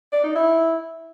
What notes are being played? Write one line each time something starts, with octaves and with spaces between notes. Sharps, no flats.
D5
D#4
E4